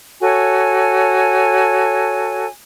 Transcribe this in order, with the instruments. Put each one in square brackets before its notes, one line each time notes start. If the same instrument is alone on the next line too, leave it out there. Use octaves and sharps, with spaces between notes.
[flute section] F#4 A4 C#5 G#5